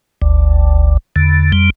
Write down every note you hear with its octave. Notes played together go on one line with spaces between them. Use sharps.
G1 D2
E2 D3
F2 G3